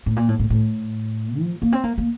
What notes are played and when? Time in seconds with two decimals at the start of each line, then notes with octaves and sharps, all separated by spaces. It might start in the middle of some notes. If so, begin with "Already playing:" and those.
0.06 A2
0.16 A#2
0.29 A2
0.40 A2
0.50 A2
1.39 F3
1.62 A#3
1.72 C4
1.84 A#3
1.98 A#3